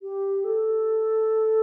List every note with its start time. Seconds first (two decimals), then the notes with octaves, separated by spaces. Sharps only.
0.02 G4
0.44 A4